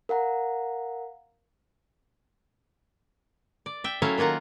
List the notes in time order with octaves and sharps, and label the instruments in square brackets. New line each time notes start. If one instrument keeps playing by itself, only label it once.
[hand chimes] A#4 F5 F#5 A#5
[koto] D5
E5 G5
F#3 A3 C#4 E4 E5 F5
D#3 A#3 F4 F#5 A#5